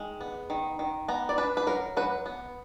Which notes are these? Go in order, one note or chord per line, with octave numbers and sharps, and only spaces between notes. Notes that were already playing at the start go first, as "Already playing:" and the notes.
Already playing: D#3 G#3
B3
D#3
D#3
B3 A#5
D5
D4 B4
B4
F#3 A#4
F#3 B4
B3